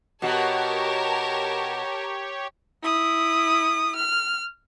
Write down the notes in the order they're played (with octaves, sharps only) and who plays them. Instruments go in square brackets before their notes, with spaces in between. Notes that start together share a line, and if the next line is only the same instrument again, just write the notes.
[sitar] B2 F#4 [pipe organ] G4 C#5 [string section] A#4 A5
[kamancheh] E4 D#6
F6